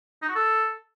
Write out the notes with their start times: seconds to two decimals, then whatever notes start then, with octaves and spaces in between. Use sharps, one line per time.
0.22 D#4
0.29 F#4
0.35 A4